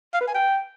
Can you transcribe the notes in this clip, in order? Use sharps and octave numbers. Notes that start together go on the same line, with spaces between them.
F5
B4
G#5
G5